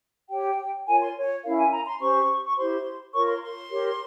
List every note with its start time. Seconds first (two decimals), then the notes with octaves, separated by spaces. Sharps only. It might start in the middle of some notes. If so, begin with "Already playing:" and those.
0.30 G4 C#5 G5
0.87 F4 A#4 C#5 G#5
1.01 C6
1.16 C#5
1.43 C#4 E4 A#4 F5
1.58 G#5
1.72 A#5
1.86 C6
2.00 C#4 G4 C5 C#6
2.44 C#6
2.57 E4 G4 C5 C6
3.13 F4 A#4 C#5 C#6
3.28 C6
3.42 C6
3.70 G4 A#4 C#5